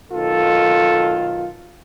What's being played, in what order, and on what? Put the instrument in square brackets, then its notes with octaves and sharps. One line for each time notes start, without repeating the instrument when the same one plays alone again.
[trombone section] B1 D#3 F4 [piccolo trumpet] A4